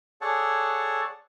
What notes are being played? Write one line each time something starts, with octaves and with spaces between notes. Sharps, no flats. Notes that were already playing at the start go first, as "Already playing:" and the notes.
G#4 A4 C#5 D5 F#5 A5